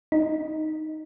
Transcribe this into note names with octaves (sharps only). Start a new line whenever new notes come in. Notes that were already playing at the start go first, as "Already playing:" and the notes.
D#4